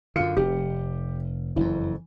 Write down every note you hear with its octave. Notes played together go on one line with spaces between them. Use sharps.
F#2 D3 F4 F6 C#7
F1 G4
F#1 F2 E3